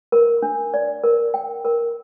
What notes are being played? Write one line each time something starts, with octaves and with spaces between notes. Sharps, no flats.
A#4
D4
D5
A#4
G5
A#4